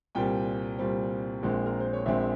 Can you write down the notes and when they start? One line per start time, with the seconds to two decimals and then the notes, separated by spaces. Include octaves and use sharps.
0.15 C2 A#2 G3 C4 G5
0.79 C2 A#2 G3 C4
1.43 A#1 A#2 G#3 C4
1.66 A#4
1.80 C5
1.93 C#5
2.06 A#1 A#2 G#3 C4 E5